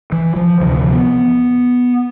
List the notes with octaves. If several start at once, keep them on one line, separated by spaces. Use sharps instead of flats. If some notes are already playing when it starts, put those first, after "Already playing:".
E3
F3
D2 C3 E3
E3
F3
B3